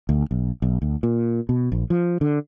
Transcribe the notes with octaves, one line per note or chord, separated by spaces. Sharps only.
D2
B1
B1
D2
A#2
B2
A#1
F3
D3